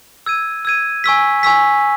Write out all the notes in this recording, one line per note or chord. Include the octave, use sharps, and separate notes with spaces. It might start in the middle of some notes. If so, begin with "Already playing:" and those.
E6 G#6 D#7
E6 G#6 D#7
G#5 C#6 E6 B6
G#5 C#6 E6 B6